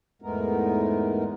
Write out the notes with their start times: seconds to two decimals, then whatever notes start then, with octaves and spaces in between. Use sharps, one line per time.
0.22 E2 G#2 G#3 A3 B3 A#4